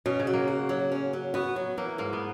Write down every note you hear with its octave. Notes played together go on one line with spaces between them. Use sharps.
B2 C#4
C#3
F#3
A#3
F#4
F#3
C#4
F#3
B3 F#4
F#3
E3 A#3
G#2 A#3
B3